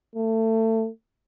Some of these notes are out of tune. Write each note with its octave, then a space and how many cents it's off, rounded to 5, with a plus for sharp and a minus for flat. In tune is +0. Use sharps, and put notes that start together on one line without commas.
A3 +25